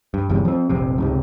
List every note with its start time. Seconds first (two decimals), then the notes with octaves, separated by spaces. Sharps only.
0.14 G2
0.29 G1 E2 G#2 C3
0.45 F3 C4
0.69 F1 A#1 C3
0.98 C#2 G#2 C3